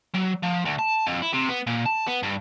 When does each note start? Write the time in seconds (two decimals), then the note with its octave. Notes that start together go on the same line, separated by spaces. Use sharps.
0.15 F#3
0.43 F3
0.65 D2
0.79 A5
1.07 F2
1.22 E4
1.33 C3
1.49 B3
1.67 A#2
1.86 A5
2.08 B3
2.23 G2